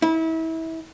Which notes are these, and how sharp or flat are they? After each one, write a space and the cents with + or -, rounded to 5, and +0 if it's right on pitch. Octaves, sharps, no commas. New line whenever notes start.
E4 -30